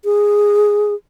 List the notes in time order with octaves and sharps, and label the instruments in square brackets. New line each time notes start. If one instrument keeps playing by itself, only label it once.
[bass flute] G#4